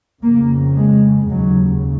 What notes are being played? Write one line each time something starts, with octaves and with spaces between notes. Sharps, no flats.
F2 C#3 A#3
G#3
D#2 C#3 F#3